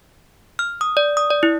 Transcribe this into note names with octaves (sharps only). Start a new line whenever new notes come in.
F6
D#6
D5
D#6
D5
E4